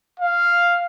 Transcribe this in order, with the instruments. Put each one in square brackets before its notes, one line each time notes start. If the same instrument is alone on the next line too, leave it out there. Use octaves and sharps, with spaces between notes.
[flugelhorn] F5